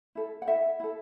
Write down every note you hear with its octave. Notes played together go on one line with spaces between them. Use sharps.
E4 A4
F#5
E4 A4 E5
E4 A4